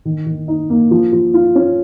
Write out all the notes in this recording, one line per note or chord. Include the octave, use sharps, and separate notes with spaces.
D#3
D#3
D#4
A#3
F3
F3
F4
C#4